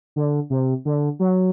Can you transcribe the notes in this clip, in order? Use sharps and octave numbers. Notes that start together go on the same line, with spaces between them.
D3
C3
D3
F#3